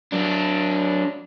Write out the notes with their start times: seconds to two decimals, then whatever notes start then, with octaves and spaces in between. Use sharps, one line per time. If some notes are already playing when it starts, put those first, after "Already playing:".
0.12 F#3 D4